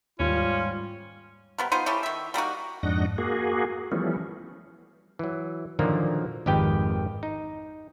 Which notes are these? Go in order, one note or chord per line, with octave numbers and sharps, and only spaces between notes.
D#2 G#2 G3 C#4 F4
C3 B3 A#4
B3 D#4 F4 C5
A3 C#4 E4 G4
D#3 E5
G3 A#3 D#4 F#4
F2 G#2 D4 D#5 F#5 A#6
A#3 F#4 G#4
E3 F3 G3 A3 B3 C#4
E3 F#3
A#2 D3 D#3 F3 F#3 A#3
G#1 F2 D#3 G4 B4 G5
D#4